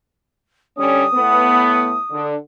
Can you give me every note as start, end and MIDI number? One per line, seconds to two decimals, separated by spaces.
0.77 1.04 50
0.77 1.04 55
0.77 1.04 61
0.77 2.25 87
1.14 1.94 45
1.14 1.94 57
1.14 1.94 59
2.10 2.34 50